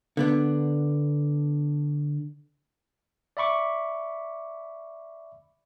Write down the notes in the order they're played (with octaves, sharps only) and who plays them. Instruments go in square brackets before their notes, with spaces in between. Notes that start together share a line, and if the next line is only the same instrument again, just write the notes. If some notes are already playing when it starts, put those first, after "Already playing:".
[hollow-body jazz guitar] D3 B3 D4
[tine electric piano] D5 E5 B5 C#6 D6